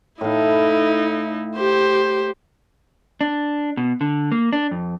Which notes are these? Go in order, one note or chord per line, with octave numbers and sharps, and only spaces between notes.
A2 D#4 E4 F5
G4 C5
D4
B2
D3
A#3
D4
F2